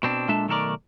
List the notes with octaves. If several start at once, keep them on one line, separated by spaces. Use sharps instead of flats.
B2 C4 D4
A#2 G#3 D4 A4 E5 A5
B1 D#3 A3 F#4 A#4 D5